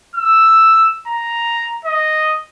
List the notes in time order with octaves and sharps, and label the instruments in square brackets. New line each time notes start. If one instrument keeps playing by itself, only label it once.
[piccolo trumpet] E6
A#5
D#5